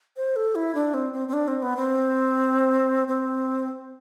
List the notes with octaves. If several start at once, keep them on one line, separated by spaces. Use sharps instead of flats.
C5
A4
E4
D4
C4
C4
C4
D4
C4
B3
C4
C4